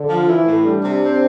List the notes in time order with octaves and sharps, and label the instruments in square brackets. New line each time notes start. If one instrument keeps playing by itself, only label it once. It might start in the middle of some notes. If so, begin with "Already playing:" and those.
Already playing: [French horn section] D3
[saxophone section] F3
[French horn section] E3 [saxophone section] E4
[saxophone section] A2
[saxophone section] G3 [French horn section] D4
[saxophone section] C3
C4